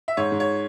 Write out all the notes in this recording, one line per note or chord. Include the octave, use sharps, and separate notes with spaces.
E5
G#2 C#5
G#2
C#5